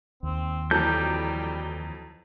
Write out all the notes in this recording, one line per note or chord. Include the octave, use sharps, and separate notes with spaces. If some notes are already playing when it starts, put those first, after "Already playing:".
D#2 C4
F2 E3 F#3 G3 G6